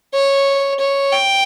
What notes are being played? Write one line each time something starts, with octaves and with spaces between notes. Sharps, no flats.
C#5
C#5
G5